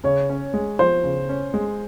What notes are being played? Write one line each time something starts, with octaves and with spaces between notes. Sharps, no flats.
C#3 C#5
C#4
G#3
F3 C5
C#3
C#4
G#3